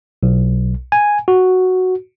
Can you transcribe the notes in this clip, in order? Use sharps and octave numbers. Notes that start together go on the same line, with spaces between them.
B1
G#5
F#4